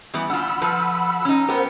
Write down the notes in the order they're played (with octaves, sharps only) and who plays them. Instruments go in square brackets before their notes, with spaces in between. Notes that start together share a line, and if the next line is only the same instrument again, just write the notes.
[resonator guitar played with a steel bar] E3 G3 B3
[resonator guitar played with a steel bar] D4 F4 [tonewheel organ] F#5 B5 E6
[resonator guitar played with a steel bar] F3 A4 B4
C#4 D#4
[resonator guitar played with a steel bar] B3 G4 [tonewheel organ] A#4 C5 F#5